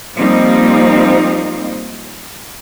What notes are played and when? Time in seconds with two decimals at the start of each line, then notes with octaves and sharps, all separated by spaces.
0.16 F3 G3 A#3 C4 D#4